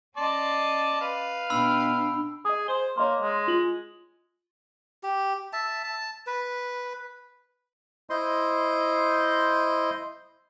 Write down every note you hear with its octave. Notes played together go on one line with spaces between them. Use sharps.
C#4 D5 D#5 A5 C6
B4 F5
B2 D4 G5 B5 E6
G#4 D#5 D#6
C5 G7
A#3 C#5 D#5 C6
G#3
F4 F#7
G4
E5 A5
A5
B4
E4 C5 D#5 C6